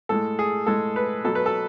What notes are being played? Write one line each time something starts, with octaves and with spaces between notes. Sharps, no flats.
A2 G#3 A4
G#4
A2 G#3 A4
B4
B2 F#3 A4
B4
A4